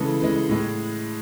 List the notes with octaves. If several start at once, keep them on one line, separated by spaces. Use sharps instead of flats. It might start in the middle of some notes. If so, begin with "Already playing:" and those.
Already playing: C#3 E3 G#3 A4
C#3 E3 G#3
A2 G#3